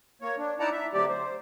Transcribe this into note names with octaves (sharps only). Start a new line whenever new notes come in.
A#3 C#5
D4
D#4 E4 D5 F#5 A5 A#5
E5
D3 F#3 A3 C4 G4 D5
C5